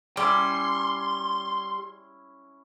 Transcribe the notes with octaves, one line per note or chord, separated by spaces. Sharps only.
G3 C#4 E4 C6